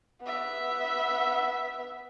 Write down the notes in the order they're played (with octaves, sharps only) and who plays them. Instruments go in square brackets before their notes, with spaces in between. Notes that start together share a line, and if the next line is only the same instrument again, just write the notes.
[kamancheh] B3 E5